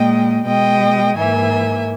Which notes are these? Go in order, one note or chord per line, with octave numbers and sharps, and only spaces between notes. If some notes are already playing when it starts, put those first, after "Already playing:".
Already playing: A#2 G#3 D#5 G5
B2 G#3 D#5 G5
G#2 E3 A#3 E5 G#5